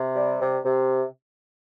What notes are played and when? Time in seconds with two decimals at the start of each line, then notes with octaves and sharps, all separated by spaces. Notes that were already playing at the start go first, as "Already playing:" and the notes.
Already playing: C3
0.16 G3
0.39 C3
0.62 C3